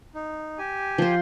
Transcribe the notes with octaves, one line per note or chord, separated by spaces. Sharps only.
D#4
G4 G#5
F3 C5